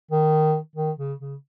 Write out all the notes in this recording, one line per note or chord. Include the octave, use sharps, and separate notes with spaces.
D#3
D#3
C#3
C#3